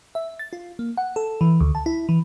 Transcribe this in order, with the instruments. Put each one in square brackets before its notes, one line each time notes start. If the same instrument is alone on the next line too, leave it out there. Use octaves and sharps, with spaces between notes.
[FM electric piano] E5
A6
F4
A#3
F#5
A4
E3
D2
A5
E4
E3